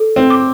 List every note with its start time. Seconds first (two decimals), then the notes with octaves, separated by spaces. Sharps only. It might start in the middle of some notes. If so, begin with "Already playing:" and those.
Already playing: A4
0.16 C4
0.30 D6